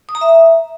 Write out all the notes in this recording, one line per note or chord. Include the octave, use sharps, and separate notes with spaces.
D#6
A#5
E5